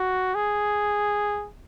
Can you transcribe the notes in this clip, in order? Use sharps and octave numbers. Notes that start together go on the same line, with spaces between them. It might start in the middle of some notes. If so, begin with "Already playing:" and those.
Already playing: F#4
G#4